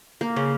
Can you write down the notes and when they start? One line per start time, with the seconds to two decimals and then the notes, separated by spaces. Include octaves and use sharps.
0.21 A#3
0.36 C#3 C#4